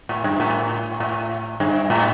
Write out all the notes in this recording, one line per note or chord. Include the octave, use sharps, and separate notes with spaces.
A2
G2
A2
A2
G2
A2